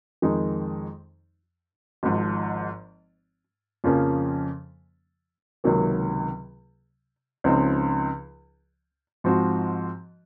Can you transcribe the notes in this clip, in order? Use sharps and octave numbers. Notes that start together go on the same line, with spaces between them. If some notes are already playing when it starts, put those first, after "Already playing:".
F2 D#3 G#3 D#4
G#1 G#2 F3
F2 C#3 F3 A#3 C#4
C#2 C3 D#3 F#3 A#3
C#2 C#3 F3 C4 D#4
G#2 F3 C4 F#4